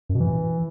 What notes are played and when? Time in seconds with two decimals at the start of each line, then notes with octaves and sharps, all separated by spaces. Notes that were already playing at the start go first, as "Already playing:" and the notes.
0.09 F#2
0.15 B2
0.20 E3